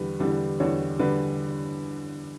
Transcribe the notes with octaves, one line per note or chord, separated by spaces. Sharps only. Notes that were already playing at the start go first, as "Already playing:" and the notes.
Already playing: E2 D3 G3 B4
E2 D3 G3
E2 D3 G3 C#5
D3 G3 B4